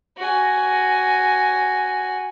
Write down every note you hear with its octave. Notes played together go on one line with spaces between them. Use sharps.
F#4 G#5